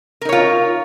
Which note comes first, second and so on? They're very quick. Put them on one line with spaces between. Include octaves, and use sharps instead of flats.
A#4 D#4 C#5 F4